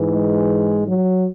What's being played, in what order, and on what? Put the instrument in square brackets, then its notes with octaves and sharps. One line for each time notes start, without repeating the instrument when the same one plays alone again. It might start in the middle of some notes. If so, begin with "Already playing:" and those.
Already playing: [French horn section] G#2 E3
G#3
F#3